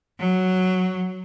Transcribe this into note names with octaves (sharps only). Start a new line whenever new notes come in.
F#3